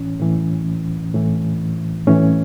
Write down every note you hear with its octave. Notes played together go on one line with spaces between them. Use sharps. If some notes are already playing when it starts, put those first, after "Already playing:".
Already playing: A2 E3 C#4
A2 E3
A2 E3
A2 E3 C#4